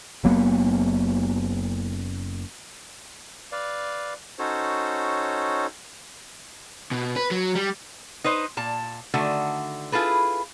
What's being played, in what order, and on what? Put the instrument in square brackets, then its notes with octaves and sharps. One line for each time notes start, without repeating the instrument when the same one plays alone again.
[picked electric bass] F#1 F#3 A#3 B3
[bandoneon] B4 D5 F5
C#4 D#4 F#4 A4 C5 C#5
[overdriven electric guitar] B2
B4
F#3
G3
[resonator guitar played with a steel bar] D#4 B4 C5 D#5
A#2 A5
D3 D#3 A3 F#4
E4 F4 G#4 A4 B4